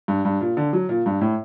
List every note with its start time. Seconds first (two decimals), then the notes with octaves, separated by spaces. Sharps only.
0.08 G2
0.25 G2
0.41 A#2
0.57 D3
0.73 F#3
0.89 A#2
1.06 G2
1.21 A2